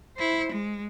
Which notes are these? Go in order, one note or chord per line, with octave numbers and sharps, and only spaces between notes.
E4 C5
G#3